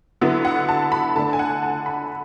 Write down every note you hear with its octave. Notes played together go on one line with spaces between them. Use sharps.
D3 F#3 B3 E4
F#5
A5
B5
D3 A3 D4 A5
G#5
F#5
A5
B5